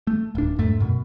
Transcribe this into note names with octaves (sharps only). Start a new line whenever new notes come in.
A3
D1 D4
F2 G#2 A3
F#2 B2